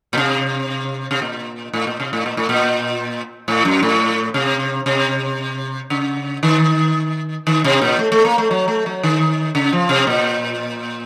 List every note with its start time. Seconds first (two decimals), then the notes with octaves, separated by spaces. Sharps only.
0.13 A#2
0.18 C3
1.11 C3
1.22 A#2
1.73 A2
1.87 A#2
2.00 C3
2.13 A2
2.26 A#2
2.37 A2
2.49 A#2
3.48 A2
3.65 F#2
3.83 A2
4.34 C3
4.86 C3
5.90 C#3
6.43 D#3
7.47 D#3
7.64 C3
7.81 A#2
7.99 A3
8.12 A3
8.25 A#3
8.38 A3
8.51 F#3
8.68 A3
8.86 F#3
9.03 D#3
9.55 C#3
9.72 F3
9.89 C3
10.07 A#2